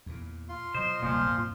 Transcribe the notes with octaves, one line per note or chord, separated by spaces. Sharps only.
E2 A#2
F4 C6
B2 F#3 C5 D#5
F1 D#2 A#2 F3 G3
A#1 F2 G#2